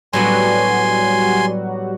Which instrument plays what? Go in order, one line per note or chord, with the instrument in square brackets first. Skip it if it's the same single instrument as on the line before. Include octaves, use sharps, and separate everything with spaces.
[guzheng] A2 B3 D4 [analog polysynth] F#3 G3 F#4 [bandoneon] G#5 C6